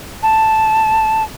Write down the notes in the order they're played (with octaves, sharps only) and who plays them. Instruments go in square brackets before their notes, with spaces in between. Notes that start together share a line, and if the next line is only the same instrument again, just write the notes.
[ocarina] A5